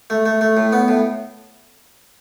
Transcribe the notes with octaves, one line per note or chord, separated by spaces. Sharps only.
A3
A3
A3
A2
B3
A2